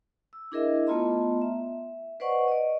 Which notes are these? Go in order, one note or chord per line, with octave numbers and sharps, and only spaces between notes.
E6
D4 E4 G#4 A#4 D#5 E5
A3 B3 F4 D#5 A#5 C6
E5
B4 C5 D5 D#5 F#5 C#6
D5 D#5